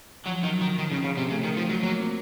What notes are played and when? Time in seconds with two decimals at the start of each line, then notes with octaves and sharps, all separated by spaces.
0.26 F3 F#3
0.43 D#3 F#3
0.60 D#3 F3
0.78 D#3 F3
0.92 C#3
1.04 C#3
1.17 C3
1.30 C#3 A3
1.44 D#3
1.57 F3
1.69 F#3
1.83 F#3 A#3
2.00 C4